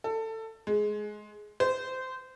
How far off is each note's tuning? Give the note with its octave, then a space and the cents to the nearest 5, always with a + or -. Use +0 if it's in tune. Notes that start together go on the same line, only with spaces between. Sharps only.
A4 +20
G#3 +15
C5 -20